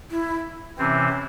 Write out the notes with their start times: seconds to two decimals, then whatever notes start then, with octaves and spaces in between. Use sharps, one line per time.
0.10 E4
0.78 C3 E3 C4 C#4